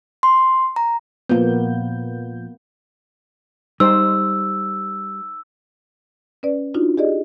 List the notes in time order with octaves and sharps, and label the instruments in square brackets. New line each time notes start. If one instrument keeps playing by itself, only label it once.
[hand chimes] C6
A#5
[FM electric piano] A#2 F3 G6 [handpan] A#3 B3
[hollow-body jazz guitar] G3 [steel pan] D#4 C5 [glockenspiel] E6
[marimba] C#4 B4 D5
D4 D#4 F4 F#4
G4 G#4 D5 D#5